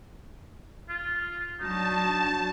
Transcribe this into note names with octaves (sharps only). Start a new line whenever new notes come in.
F4
F#3 D4 D#4 F#4 A5